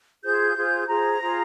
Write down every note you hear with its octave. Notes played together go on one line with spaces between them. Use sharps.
F4 G#4 C5 G6
F4 G#4 C5
F4 G#4 C5 A#5
F4 G#4 C5